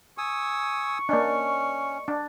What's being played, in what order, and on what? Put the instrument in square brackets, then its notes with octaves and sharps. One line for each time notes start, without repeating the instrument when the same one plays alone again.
[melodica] G#5 D#6 E6 [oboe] C#6
[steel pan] A#3 D4 [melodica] C#4 [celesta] D5 D#5
[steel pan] D4